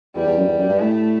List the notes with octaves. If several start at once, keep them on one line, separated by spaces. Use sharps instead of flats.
E2 G3
E2
F#2
E2
F#2
G2
A2 A3